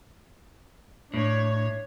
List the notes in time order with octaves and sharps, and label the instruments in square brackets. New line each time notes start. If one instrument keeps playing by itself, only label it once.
[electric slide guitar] A2 [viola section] D4 C#5